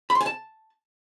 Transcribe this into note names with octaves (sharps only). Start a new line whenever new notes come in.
B5
C6
G#5
A5